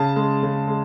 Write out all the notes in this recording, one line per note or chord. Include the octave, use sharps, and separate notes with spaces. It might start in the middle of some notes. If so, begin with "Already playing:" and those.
Already playing: C#3 A5
G#3
C#3
G#3